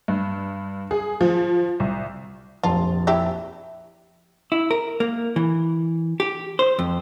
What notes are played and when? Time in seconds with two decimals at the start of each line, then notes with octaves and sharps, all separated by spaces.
0.08 G2
0.91 G#4
1.21 F3
1.80 C2
2.63 F1 A#1 F4 A5
3.07 E4 G4 E5
4.52 E4
4.71 A#4
5.00 A#3
5.36 E3
6.20 G4
6.59 C5
6.79 F2